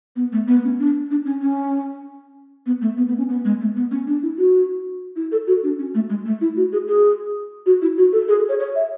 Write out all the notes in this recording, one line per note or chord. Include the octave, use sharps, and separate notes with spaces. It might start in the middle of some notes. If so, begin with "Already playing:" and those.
B3
A3
B3
C#4
D4
D4
C#4
C#4
B3
A3
B3
B3
C#4
B3
G#3
A3
B3
C#4
D4
E4
F#4
E4
A4
F#4
D4
C#4
A3
G#3
A3
E4
F#4
G#4
G#4
F#4
E4
F#4
A4
G#4
C#5
C#5
E5